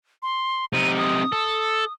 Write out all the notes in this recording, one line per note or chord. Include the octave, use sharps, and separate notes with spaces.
C6
C3 D#4 D#7
D#6
A4